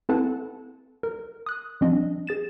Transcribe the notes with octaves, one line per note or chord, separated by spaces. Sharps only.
C4 E4 A4 B4 F#5 A5
A#4
D#6 F#6
F3 G3 C4 D4 D#5
G#4 A6 E7